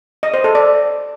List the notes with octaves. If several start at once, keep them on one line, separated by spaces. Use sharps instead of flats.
D#5
C5
A4
D5